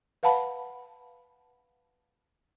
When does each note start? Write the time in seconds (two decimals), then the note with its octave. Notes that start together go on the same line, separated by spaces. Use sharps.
0.23 B4 F5 F#5 A5 B5